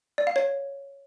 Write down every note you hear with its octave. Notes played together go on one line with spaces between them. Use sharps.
D5
F5
C#5